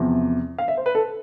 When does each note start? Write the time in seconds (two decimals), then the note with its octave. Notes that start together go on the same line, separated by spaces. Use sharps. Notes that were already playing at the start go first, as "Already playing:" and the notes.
Already playing: E2 C3 F3
0.58 F5
0.68 E5
0.77 C5
0.86 B4
0.95 A4